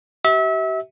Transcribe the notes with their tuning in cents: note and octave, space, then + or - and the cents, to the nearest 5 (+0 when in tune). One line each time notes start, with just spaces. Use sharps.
G4 -40 E5 -30